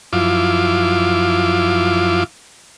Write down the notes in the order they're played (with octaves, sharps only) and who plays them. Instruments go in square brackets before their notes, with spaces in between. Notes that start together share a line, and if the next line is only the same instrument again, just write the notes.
[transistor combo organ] F#2 F3 E4 F4 D6